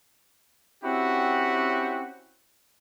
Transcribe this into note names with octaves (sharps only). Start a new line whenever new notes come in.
C4 C#4 E4 F#4 G4